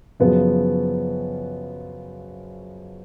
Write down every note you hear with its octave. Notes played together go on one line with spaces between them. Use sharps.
F#2 C#3 F3 B3 F#4